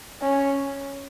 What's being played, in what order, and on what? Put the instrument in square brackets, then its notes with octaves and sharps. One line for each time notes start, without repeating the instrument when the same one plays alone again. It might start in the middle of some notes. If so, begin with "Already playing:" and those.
[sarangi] C#4